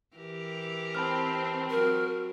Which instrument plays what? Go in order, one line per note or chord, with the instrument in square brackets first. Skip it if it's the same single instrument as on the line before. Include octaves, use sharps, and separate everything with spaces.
[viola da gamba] E3 G4 A#4
[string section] C4 [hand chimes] A5 B5 F6
[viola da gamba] F#3 [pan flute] A#4